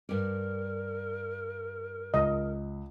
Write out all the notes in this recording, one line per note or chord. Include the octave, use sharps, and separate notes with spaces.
G2 A#4 D5
C#2 D#5